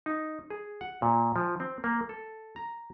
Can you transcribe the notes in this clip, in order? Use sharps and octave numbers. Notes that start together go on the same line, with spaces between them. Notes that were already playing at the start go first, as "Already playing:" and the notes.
D#4
G#4
F#5
A#2
F3
C4
A#3
A4
A#5